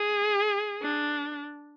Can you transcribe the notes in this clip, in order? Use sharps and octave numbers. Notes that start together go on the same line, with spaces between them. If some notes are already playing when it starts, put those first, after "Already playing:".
Already playing: G#4
D4